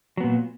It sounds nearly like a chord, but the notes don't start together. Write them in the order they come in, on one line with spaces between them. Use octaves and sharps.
F#3 B3 A#2